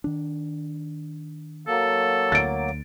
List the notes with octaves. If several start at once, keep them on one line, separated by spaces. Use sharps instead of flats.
D#3 D4
F#3 A#3 A4
D2 A6 D7